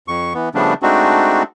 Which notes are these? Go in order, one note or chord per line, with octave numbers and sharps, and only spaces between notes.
F2 C#6
E3 B3
C#3 F3 G3 A3 B3 D4
G#3 A3 C4 D4 D#4 F#4